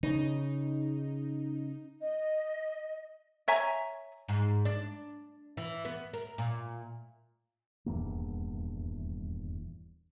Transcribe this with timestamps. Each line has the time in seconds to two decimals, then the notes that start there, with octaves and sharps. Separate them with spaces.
0.03 C#3 D#4
2.00 D#5
3.48 C#5 E5 G#5 A#5
4.29 G#2
4.65 D4
5.57 E3
5.85 B3
6.13 A#4
6.38 A#2
7.86 D#1 E2 G2 A#3